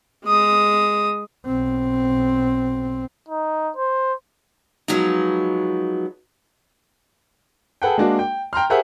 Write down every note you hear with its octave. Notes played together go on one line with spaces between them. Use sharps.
G#3 D#6
B1 C4
D#4
C5
F3 F#3 G#3 B3 D#4
G#4 A4 B4 F#5 G5
G#3 A#3 D4 F#4
G5
G5 A#5 C6 F6
G4 G#4 A#4 C5 E5 F#5